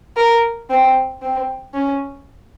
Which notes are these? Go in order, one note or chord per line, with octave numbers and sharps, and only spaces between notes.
A#4
C4
C4
C#4